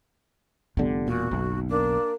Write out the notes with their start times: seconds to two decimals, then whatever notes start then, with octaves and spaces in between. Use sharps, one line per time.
0.77 F1 D3 G3 B3 F4
1.08 E1 A#2 F#4
1.31 F#1 B1
1.69 A#3 D4